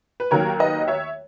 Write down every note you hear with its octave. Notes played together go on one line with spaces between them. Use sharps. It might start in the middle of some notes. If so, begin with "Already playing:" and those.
B4
D#2 D#3 F#3 A#3 A#4 C#5
B4 D#5
C#5 E5